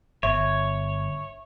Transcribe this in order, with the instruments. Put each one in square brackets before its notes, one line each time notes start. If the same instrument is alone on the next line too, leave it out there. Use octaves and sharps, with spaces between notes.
[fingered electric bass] G1 [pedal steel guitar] C#5 [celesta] E5